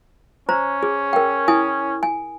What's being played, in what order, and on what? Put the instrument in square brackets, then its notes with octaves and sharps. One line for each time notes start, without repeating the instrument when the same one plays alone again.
[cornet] C#4 [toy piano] C5 A#5
[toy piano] G#4
A#4 G5
E4 G#5 D#6
G#5